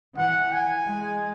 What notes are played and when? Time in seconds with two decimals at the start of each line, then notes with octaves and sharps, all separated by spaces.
0.17 E3 F#5
0.52 G#5
0.87 G#3